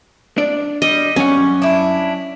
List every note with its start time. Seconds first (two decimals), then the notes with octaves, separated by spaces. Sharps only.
0.38 D4 D5
0.82 G3 D#5
1.16 F#2 C#4 F#5
1.62 D4 E4